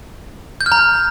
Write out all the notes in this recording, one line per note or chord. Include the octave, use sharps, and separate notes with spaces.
G6
F6
A#5